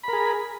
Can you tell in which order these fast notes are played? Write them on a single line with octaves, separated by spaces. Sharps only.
B5 A#4 G#4